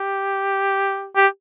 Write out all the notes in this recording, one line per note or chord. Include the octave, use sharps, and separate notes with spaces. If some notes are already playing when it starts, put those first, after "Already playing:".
Already playing: G4
G4